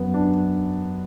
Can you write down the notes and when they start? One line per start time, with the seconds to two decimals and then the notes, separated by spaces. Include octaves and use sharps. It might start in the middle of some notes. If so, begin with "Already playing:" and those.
Already playing: F#2 B3
0.14 D4